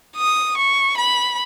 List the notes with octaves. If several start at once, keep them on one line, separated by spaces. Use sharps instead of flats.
D#6
C#6
B5